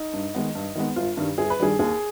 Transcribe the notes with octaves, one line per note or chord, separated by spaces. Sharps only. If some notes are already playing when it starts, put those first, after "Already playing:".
Already playing: D#4
G2
D#3 G#3 B3
G2
D#3 G#3 B3
G1 F4
G2 D#3 G3
G1 G#4
B4
G2 D#3 G3 G#4
D#2 G#4